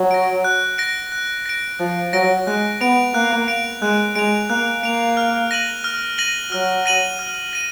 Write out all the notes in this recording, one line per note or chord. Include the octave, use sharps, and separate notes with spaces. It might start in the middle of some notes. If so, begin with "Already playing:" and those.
Already playing: F#3
A#6 D7
F#6
A#6 D7
F#6
A#6 D7
F3 F#6
F#3 A#6 D7
G#3 F#6
B3 D7 F7
A#3 F#6
D7 F7
G#3 F#6
G#3 D7 F7
A#3 F#6
A#3 D7 F7
F6
A#6 D#7 F#7
F6
A#6 D#7 F#7
F#3 F6
A#6 D#7 F#7
F6
A#6 D#7 F#7